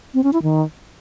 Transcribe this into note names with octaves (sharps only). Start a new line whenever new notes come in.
C4
C#4
E4
D#3